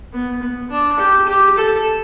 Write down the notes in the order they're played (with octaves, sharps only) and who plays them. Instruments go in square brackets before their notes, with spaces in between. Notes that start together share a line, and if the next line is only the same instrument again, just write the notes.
[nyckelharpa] B3
B3
D4
G4
G4
A4